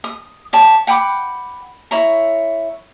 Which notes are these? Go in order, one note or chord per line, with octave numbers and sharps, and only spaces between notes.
D#6
G4 C#5 A5
F#5 G5 B5 D6
E4 C#5 A#5